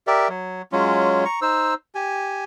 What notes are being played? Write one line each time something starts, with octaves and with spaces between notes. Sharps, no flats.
G4 A#4 D5 E5
F#3
F#3 G#3 C#4 F4
A#5 C#6
D#4 C5 E6
G4 G#5